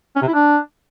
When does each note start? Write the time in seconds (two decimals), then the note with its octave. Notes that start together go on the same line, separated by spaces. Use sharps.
0.16 C#4
0.22 C3
0.28 E4
0.34 D4